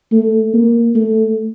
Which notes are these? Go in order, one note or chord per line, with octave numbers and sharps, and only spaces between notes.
A3
A#3
A3